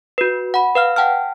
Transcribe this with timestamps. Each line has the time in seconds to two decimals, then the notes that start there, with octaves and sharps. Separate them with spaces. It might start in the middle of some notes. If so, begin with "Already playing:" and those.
0.18 F#4 B4
0.54 F#5 B5
0.75 B4 F5 F6
0.96 F#5 G5 A5 F6